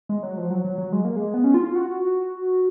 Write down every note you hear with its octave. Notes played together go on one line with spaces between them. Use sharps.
G#3
F#3
F3
F#3
F#3
F#3
G#3
A#3
G#3
B3
C#4
F4
F4
F#4